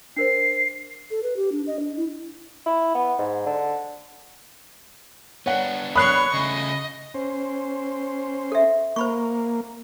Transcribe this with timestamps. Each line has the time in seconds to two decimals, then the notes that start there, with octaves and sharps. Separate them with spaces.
0.17 D4 A#4 C5 C7
1.10 A4
1.23 B4
1.36 G4
1.52 D4
1.67 D#5
1.79 D4
1.97 E4
2.66 E4
2.95 B3
3.19 G#2
3.46 D3
5.46 B3 D4 C#5 F#5
5.95 C#5 B5 C#6 D#6 F#6 C7
6.34 C#3 A3 D#5
7.14 C#4 C5
8.52 A4 E5
8.96 A#3 C5 B5 C#6